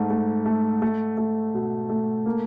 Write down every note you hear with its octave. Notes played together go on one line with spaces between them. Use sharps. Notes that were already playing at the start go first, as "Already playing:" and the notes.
Already playing: G#2 A3
A3
A3
A3
A3
B2
A3
A#3